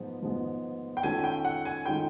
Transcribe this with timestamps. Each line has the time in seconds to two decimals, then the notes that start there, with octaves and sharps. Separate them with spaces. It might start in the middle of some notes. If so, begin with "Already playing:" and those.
Already playing: G#2 F3 G#3 B3
0.21 G#2 F3 G#3 B3
0.97 G5
1.03 D#3 G#3 C#4 F4 A4 G#5
1.24 G5
1.45 F#5
1.65 G#5
1.85 D#3 G#3 C#4 F4 A4 G5